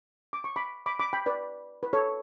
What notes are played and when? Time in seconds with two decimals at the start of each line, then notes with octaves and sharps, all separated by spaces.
0.33 D6
0.44 C#6
0.56 B5 D6
0.86 B5 D6
0.99 B5 D6
1.13 G5 B5
1.26 B4 D5
1.83 B4
1.93 A4 C#5